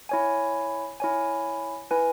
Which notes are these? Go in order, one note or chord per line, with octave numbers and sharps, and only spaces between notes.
E4 C#5 G#5
E4 C#5 G#5
E4 B4 G#5